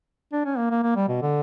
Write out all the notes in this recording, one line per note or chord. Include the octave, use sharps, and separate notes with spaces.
D4
C#4
A#3
A#3
A#3
G3
B2
D3